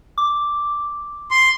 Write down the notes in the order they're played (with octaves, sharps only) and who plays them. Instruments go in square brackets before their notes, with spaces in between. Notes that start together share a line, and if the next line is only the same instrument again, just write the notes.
[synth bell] D6
[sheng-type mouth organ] C6